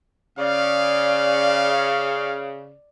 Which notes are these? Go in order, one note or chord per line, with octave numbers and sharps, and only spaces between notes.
C#3 D5 F5